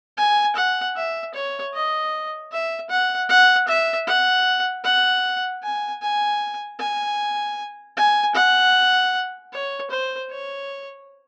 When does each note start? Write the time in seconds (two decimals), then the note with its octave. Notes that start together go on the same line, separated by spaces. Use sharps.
0.18 G#5
0.56 F#5
0.97 E5
1.35 C#5
1.74 D#5
2.52 E5
2.90 F#5
3.30 F#5
3.68 E5
4.07 F#5
4.85 F#5
5.63 G#5
6.02 G#5
6.80 G#5
7.97 G#5
8.35 F#5
9.53 C#5
9.91 C5
10.30 C#5